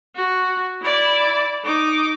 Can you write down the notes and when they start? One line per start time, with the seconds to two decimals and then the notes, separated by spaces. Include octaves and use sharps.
0.16 F#4
0.82 E4 D5
1.64 D#4 D6